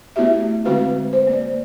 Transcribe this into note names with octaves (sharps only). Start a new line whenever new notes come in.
A3 B3 E4 F#4 G4 E5
D3 G#3 C4 F#4 B4 F5
C5
A#3 D5